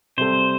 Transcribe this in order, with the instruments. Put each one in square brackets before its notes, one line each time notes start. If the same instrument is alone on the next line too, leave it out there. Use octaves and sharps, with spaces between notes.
[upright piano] C3 G3 C4 A4 [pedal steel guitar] C5